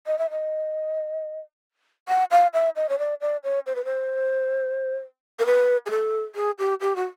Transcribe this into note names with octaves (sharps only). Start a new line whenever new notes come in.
D#5
E5
D#5
F#5
F5
E5
D#5
C#5
D5
D5
C#5
C5
B4
C5
A#4
B4
G#4
A4
G#4
G4
G4
F#4